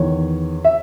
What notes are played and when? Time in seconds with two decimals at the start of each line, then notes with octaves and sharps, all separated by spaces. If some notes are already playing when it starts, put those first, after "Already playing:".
Already playing: E2 D#3 C#5
0.65 E5